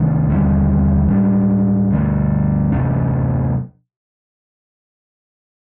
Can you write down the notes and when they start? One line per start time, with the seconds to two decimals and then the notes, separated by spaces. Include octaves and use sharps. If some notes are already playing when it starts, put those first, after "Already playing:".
Already playing: C3 D#3 A3 D4
0.29 D#2 D3 G3 C4
1.10 A2 G3 D4
1.91 G2 D3 A3
2.72 C3 F#3 A3 D4